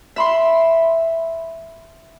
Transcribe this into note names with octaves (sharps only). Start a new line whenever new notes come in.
E5 B5 C6